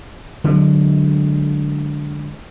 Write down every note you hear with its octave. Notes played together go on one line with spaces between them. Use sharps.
D3 F#3 G#3